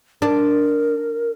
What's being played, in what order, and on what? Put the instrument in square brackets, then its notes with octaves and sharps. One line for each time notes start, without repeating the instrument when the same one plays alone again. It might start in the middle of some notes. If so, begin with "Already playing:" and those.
[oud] D4 [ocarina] A#4